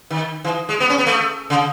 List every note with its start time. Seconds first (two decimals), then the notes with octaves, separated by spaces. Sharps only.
0.10 D#3
0.44 E3
0.69 G#3
0.80 B3
0.89 C#4
0.98 B3
1.07 A3
1.50 C#3